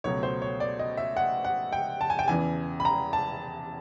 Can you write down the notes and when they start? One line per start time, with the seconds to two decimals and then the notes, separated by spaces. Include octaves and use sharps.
0.04 C#2 B2 F#3 A3 C#5
0.23 C5
0.42 C#5
0.60 D5
0.79 D#5
0.97 E5
1.17 F#5
1.44 F#5
1.73 G5
2.01 A5
2.10 G#5
2.19 G5
2.28 E2 C#3 E3 G#5
2.80 B5
2.85 A#5
3.13 A5